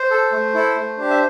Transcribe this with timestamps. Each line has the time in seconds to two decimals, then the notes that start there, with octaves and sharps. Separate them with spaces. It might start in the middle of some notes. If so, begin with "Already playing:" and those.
Already playing: C5
0.10 A4
0.32 A3
0.54 E4 A4
0.76 A3
0.97 D4 G4
1.10 E5